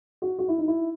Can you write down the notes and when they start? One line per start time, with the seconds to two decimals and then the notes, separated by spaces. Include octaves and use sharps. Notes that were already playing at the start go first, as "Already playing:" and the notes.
0.22 F#4
0.39 F#4
0.48 E4
0.58 D#4
0.68 E4